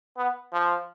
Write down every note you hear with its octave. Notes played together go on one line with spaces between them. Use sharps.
B3
F3